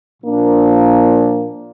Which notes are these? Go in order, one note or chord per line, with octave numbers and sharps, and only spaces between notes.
A#2 F3 A#3 D4